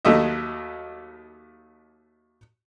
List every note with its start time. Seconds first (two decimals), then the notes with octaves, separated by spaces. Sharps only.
0.05 D#2 F#3 A3 D#4 D#5 E5